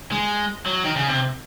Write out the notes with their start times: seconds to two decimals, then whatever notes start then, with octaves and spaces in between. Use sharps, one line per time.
0.12 G#3
0.66 F#3
0.84 D#3
0.96 C#3
1.08 C3